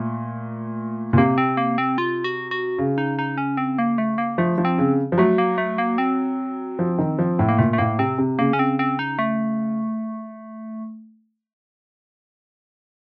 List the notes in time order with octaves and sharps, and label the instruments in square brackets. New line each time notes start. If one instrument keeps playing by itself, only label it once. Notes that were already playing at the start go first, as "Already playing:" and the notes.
Already playing: [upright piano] A#2 [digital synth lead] A3
[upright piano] A#2
[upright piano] C3 [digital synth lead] A#3
[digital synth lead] C4
A#3
C4
F4
F#4
F#4
[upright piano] C#3
[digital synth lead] D#4
D#4
C#4
C4
A#3
A3
A#3
[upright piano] F3 [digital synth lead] A3
[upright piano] F3
[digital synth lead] C4
[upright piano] C#3
F3
[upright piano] F#3 [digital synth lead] A3
[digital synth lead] A#3
A3
A#3
C4
[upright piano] F3
D#3
F3
A2
[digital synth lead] A#3
[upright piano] A#2 [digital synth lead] A3
[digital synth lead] A3
[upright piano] A2 [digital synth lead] A#3
[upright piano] C3 [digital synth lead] C4
[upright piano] C3
[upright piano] C#3 [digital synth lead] A#3
[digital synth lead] C#4
C4
C4
D#4
A3